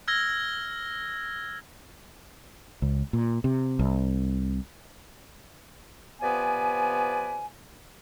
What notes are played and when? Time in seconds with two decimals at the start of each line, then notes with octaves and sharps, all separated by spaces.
0.08 E6 F6 G#6 A#6 G7
2.82 C#2
3.13 A#2
3.44 C3
3.79 C2
6.21 C3 F3 B3 B4 D5 G#5